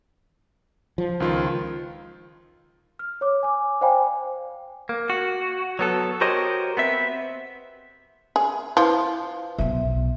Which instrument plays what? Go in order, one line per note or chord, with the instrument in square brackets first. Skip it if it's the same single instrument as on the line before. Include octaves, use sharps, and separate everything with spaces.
[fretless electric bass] F3
[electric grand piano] C#2 D#3 F4
[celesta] F6
C#5 D6
G#5 D6
C5 D5 F5 G5 G#5 B5
[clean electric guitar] A#3
F#4
F#3 B3 A4
F#4 G4 A#4 C5 C#5 D#5
B3 C4 E5
[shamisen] G#4
[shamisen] F3 [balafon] E4 B4
[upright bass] B1 B2 [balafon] E5